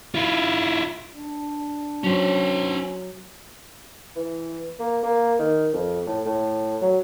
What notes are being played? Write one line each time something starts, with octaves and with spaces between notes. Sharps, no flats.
E4 F4
D4
F#3 C#4 C5
E3
A#3
A#3
D#3
F2
A2
A2
F#3